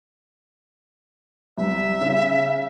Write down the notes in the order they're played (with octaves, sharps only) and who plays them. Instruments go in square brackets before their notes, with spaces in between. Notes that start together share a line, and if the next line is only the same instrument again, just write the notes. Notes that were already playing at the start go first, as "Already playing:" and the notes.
[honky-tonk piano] C2 [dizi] E5
[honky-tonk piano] C#3